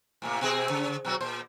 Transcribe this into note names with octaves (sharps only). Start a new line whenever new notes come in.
A2 C3 A#3
B2 C4 G#4
C#3
B2 F#3 F#4
A#2 C5